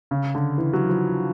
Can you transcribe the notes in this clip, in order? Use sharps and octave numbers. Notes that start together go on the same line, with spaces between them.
C#3
D3
E3
F#3
F3